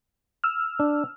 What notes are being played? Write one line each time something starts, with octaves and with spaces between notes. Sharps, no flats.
E6 F6
D4